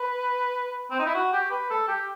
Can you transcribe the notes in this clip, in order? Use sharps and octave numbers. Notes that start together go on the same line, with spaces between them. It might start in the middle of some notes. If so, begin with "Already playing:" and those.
Already playing: B4
C4
D#4
E4
F#4
G4
B4
A4
G4